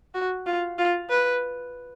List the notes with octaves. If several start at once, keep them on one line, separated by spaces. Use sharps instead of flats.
F#4
F4
F4
B4